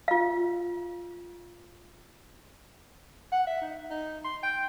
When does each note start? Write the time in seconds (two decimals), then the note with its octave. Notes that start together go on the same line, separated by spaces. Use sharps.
0.08 F4 F5
3.33 F#5
3.47 E5
3.61 D#4
3.90 D#4
4.25 C6
4.43 G5